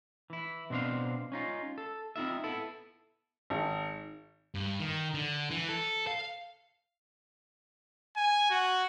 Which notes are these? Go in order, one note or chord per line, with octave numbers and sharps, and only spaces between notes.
E3 E4
B2 C4 D4 C5 F5
C#4 D#4 F4
A4
C4 D#4 F4 E5
B3 E4 A4
G#1
G2
D#3
D3
E3
A4
F5
G#5
F#4